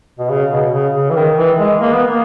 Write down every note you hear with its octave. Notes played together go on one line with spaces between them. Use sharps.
B2
C#3
B2
C#3
C#3
E3
D#3
E3
G#3
A#3
B3
A#3